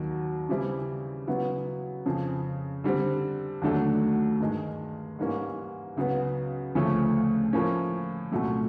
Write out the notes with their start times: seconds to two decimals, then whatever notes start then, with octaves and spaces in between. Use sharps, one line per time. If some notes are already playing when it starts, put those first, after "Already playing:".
Already playing: D#2 D#3 F#3
0.49 C#3 E3 G3 C4 E4
1.27 C#3 F#3 B3 E4
2.06 F2 C#3 F3
2.84 D3 G3 C4
3.62 D#2 D3 F#3 A3 D4
4.40 G2 D#3 G#3
5.19 G#2 E3 G3 A#3 C#4
5.97 C#2 C#3 F#3 B3
6.75 D2 C#3 F3 A3 C#4
7.53 A2 F3 A#3 C#4
8.32 C2 A#2 F#3 A3 C#4